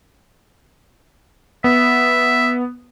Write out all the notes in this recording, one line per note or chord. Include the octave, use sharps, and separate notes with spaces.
B3 E5